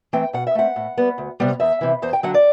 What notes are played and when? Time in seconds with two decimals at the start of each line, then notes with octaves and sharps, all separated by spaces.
0.13 E3 A3 C4 G5
0.33 B2 F#5
0.47 E5
0.55 A3 C4 F#5
0.76 A2
0.98 G3 B3
1.18 D2
1.40 C3 G3 B3
1.60 E2 E5
1.81 C3 E3
2.02 E2 C5
2.13 G5
2.23 D3 F#3 F#5
2.34 D5